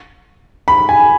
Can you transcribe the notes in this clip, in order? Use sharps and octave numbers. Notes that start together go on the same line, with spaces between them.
B5
G#5